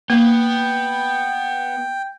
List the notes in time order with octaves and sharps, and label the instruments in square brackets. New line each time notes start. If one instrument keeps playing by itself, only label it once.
[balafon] A#3 [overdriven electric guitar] B3 [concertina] G5